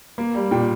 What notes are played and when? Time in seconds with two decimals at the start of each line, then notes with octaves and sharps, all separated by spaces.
0.18 A#3
0.35 G3
0.51 A#2 G5